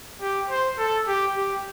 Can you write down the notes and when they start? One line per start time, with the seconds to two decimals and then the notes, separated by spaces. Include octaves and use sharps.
0.21 G4
0.50 C5
0.78 A4
1.07 G4
1.36 G4